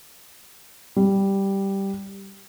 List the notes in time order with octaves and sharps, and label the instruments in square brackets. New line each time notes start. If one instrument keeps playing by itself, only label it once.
[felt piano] G3